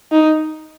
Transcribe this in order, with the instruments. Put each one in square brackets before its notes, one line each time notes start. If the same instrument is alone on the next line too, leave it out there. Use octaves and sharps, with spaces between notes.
[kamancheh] D#4